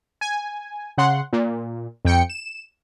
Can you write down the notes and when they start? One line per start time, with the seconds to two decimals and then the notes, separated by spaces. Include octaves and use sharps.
0.21 G#5
0.98 C#3 F#5 C6
1.33 A#2
2.05 F2 G5 C#7
2.30 E7